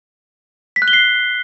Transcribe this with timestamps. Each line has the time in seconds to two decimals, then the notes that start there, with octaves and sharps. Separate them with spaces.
0.76 B6
0.82 F#6
0.88 G7
0.93 C7